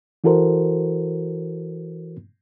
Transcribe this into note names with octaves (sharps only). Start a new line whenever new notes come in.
E3 E4 F#4 A4 A#4 C5